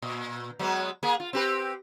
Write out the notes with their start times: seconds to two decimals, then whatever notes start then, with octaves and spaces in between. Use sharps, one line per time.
0.02 A#2
0.59 F#3 G#3 B3
1.03 A#3 G#4
1.20 F4
1.33 C4 G4 B4